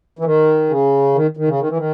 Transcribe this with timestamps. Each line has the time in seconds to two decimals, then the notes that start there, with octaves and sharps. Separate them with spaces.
0.19 E3
0.25 D#3
0.69 C#3
1.15 D#3
1.37 D#3
1.48 C#3
1.60 D#3
1.69 E3
1.77 D#3